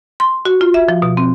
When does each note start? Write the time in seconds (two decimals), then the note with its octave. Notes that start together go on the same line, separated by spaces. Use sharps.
0.20 C6
0.45 F#4
0.61 F4
0.74 E5
0.89 F3
1.02 B2
1.17 C4